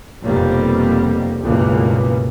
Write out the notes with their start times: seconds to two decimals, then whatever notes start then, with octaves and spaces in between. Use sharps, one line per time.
0.23 F1 F2 B2 G3 A#3
1.41 C#2 G2 B2 E3 A#3